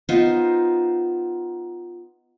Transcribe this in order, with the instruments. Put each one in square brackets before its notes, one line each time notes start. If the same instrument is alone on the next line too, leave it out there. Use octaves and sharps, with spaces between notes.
[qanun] B3 D#4 F4 C5